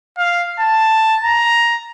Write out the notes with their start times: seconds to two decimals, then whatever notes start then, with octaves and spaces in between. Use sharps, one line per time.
0.19 F5
0.60 A5
1.24 A#5